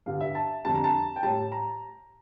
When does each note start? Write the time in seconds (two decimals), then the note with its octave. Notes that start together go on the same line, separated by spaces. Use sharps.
0.06 G2 D3 G3 F5
0.20 E5
0.35 A5
0.65 F2 D3 G3 A5
0.75 A#5
0.84 A5
1.16 G5
1.23 A2 G3 A5
1.52 A#5